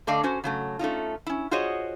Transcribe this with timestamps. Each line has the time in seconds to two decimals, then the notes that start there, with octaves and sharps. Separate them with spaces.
0.07 D3 A3 D4 D5 D#5 F5
0.23 C#4 F#4 C5
0.44 C#3 F#3 A3
0.79 A3 C#4 D#4 F4
1.26 C#4 E4
1.51 F4 F#4 G#4 C5 C#5 D#5